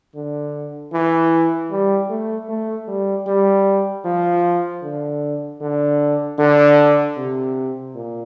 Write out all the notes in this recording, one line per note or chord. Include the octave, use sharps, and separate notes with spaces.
D3
E3
G3
A3
A3
G3
G3
F3
D3
D3
D3
C3
A#2